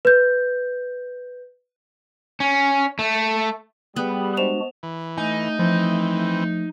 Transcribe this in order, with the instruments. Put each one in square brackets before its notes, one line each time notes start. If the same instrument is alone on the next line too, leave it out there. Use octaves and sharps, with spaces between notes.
[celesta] B4 G6
[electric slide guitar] C#4
A3
[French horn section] G3 [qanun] B3 [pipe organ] G#4 B4 B5
[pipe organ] G#3 D4 F#4 [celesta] C5 E7 F7
[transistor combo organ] E3
[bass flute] A3 [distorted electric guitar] D#4 [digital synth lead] G#5
[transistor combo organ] E3 C4 [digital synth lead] F3